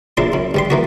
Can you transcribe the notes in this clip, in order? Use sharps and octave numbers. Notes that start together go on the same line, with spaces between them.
A#1 D4 E4 C6
F#2
G2 G3 C6
E3 A#3 F#4